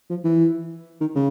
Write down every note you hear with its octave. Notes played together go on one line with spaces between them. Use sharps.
F3
E3
D#3
C#3